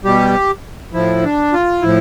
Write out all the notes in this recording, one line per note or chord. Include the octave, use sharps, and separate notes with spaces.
B2 G3 G4
A2 F3 E4
D4
F4
A2 F3 E4